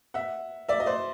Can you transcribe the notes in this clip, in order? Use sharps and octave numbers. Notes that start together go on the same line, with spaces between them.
E5 F#5
D5 E5
D#5
C5 D5